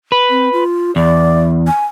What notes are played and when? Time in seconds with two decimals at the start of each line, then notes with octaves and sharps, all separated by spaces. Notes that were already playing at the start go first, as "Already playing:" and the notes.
0.12 B4
0.30 C4
0.53 F4
0.96 E2 D5
1.67 G#5